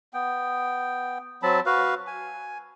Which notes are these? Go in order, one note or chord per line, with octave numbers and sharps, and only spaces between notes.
B3 G5
F#3 C4 A5 B5
F#4 B4 F5
G#5